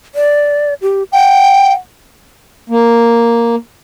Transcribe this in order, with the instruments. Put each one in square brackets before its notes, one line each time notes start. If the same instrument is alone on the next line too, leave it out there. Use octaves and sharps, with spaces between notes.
[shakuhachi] D5
G4
[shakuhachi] F#5 [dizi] G5
[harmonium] A#3